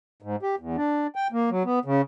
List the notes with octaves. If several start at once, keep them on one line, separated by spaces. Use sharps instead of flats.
G#2
G4
E2
D4
G5
A#3
F#3
B3
C#3